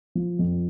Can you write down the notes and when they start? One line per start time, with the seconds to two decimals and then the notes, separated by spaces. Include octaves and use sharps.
0.15 F3
0.39 F2